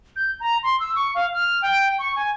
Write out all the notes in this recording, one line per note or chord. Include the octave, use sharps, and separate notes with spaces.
G6
A#5
C6
E6
C#6
F5
F6
G5
C#6
G#5